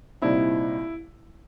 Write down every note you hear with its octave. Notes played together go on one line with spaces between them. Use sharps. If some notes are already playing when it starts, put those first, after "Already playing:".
C2 A#2 G3 C4 D#4 E4